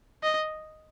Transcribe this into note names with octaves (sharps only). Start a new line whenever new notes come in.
D#5